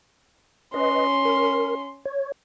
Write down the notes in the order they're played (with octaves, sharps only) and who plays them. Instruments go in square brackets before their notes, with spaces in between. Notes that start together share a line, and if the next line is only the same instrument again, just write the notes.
[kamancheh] C#4 C6 [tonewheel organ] B4 D#5
[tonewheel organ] A#4
C#5